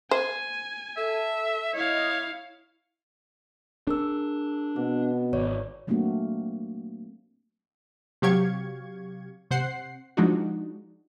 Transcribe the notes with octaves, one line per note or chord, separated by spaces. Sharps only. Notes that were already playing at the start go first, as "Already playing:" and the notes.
C5 G#5
A4 E5
E4 C#5 D#5 F5
D4 G#4 A#4 E6
B2 C4
G#1 C#5 D5
F#3 A3 A#3 C4 D4 F#4
C3 F#3 G4 F5 C#6 G#6
C3 C5 F#5 C7
F3 G#3 D4 D#4 F#4